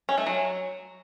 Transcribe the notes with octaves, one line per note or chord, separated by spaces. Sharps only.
C#4
A3
F#3